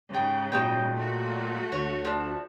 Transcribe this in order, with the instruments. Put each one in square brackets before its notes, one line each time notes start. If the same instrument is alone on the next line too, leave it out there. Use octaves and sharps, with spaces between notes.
[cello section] G#2 C#3 [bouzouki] G#4 G5
[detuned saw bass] A#2 [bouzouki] F#3 G#3 G5
[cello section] A3 F#4
[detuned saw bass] D2 [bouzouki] C#5
[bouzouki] F3 D4